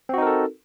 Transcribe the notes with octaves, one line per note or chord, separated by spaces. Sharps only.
C4 D#4 F#4 A4 A#4